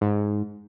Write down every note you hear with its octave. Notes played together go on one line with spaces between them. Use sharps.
G#2